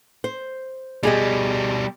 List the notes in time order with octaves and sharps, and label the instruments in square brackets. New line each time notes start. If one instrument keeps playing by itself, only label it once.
[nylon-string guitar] C5
[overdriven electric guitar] B2 G3 [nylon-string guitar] G4 G#4 D#5